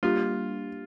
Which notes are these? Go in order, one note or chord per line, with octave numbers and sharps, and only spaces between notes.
G3 A#3 D4 F4 G4